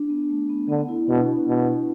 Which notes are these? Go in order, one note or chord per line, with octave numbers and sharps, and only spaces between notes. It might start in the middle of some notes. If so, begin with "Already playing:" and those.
Already playing: D4
B3
A3
B3
D3 B3
E4
B2 D4
B2